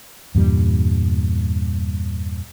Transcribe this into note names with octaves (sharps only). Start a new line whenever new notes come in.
E2 G2 A#2 G3